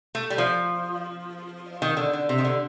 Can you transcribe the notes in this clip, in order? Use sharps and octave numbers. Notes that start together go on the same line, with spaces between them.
A3
G3
F3
D#3
D3
D3
C3
D#3
D3